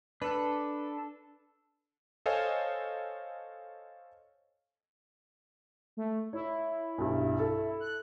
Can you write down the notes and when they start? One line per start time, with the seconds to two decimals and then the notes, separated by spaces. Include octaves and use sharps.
0.22 D4 A4 B4
2.26 A4 C5 C#5 D#5 F5 G#5
5.97 A3
6.33 E4 C#5
6.98 B1 G2
7.39 A4
7.80 F#6